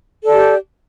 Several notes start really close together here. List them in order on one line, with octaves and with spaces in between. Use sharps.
A4 D5 G4